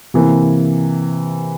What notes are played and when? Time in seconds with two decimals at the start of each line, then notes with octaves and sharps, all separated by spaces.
0.14 C3 E3 A#3